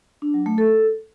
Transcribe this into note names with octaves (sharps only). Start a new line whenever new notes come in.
D4
F#3
A3
A4